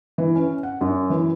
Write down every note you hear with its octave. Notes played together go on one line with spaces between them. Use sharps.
E3
C#4
F#5
F#2
E3